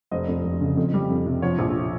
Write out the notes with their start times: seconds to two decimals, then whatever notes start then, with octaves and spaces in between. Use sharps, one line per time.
0.11 F1 C5 D#5
0.28 F2
0.45 F1
0.61 C#3
0.77 F2
0.94 G3
1.10 F2
1.26 C3
1.42 F3 C#5
1.59 A#1